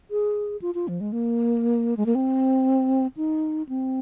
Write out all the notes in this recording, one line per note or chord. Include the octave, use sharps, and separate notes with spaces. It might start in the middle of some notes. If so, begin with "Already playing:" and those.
G#4
F4
F4
F3
G#3
A#3
G#3
A#3
C4
D#4
C4